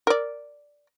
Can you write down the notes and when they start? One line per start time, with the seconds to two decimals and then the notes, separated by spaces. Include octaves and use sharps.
0.07 A#4 D5